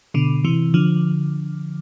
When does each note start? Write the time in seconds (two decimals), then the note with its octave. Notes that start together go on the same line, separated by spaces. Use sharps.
0.14 B2 D3
0.44 C3 E3
0.74 D3 F3